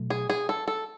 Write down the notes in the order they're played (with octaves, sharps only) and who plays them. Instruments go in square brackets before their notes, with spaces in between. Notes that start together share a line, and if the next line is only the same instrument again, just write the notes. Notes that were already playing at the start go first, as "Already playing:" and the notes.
Already playing: [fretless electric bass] B2 F#3 A3
[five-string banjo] G#4
G#4
A4
A4